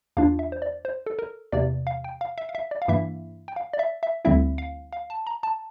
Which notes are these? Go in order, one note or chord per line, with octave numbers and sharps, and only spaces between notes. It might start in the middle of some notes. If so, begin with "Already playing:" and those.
E2 E3 A#3 D4 F4 F5
E5
C5
D5
C5
A4
A#4
E2 C3 E3 A#3 D5
F5
G5
F5
E5
F5
E5
D5
F5
G2 E3 A#3 E4 E5
G5
F5
D5
E5
E5
D2 D3 G3 C4 E4 E5
F5
F5
A5
A#5
A5